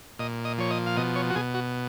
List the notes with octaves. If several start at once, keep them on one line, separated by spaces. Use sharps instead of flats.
A#2 D#5
D#5
F3 C#5
D#5
F5
B2 D#5
C#5
F#4
B2 G#4
F#4